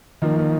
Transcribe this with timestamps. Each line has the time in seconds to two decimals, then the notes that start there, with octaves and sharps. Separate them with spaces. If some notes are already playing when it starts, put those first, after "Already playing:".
0.22 D#3 F3 A#3
0.37 A#3